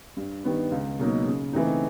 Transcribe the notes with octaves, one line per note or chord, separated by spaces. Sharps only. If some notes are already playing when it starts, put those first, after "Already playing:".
G2
D#3 G3 B3
C#2
B2 F#3 A#3 D#4
C#3
E3 A3 C4 D#4